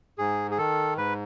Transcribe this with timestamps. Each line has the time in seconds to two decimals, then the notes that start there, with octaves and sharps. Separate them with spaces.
0.18 G#2 G#4
0.51 G#4
0.58 D#3 A4
0.97 G#2 B4